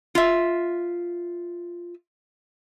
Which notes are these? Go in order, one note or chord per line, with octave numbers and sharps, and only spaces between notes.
F4 E5